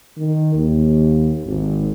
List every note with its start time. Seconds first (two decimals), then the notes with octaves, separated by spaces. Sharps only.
0.17 D#3
0.55 D#2
1.46 G#1